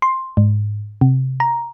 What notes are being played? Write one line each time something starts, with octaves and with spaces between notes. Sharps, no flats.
C6
G#2
C3
A#5